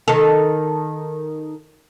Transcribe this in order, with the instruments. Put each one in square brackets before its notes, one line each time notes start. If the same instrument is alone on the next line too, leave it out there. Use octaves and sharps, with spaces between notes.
[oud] D#3 A4